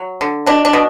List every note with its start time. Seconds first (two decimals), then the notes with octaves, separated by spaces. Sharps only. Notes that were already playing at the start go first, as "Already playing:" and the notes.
Already playing: F#3
0.21 D3
0.46 B2 D4
0.65 D4
0.73 B2